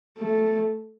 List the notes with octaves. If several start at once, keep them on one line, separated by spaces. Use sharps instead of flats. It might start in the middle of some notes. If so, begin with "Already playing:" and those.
A3